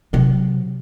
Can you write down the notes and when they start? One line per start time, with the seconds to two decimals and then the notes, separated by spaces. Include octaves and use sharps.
0.13 C3 F#3